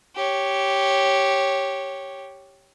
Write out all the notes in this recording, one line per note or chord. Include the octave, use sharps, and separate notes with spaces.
G4 C#5